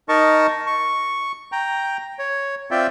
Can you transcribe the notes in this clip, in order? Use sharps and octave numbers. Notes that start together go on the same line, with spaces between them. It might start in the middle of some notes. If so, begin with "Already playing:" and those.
D#4 A#4 D#5 A5 C#6
C#6
G5 A#5
C#5
C4 F4 D5 E5 G5